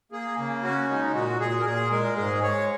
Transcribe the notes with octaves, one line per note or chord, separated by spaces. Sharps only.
A#3 G#4
C#3
C#4 F#4
G#3 D#4
A#2 F#4
A#2 G#4
A#4
A#2 G#4
G#3 A#4
G#2 G#4
G#3 C#5